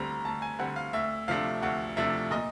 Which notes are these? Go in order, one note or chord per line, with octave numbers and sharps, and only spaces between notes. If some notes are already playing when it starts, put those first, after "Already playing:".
Already playing: D2 D3 G3 C4 A#5
D2 A5
G#5
D3 G3 C4 F#5
F5
D2 E5
C3 F3 A3 D4 F5
D2 F#5
C3 F3 A3 D4 E5
A#2 D#5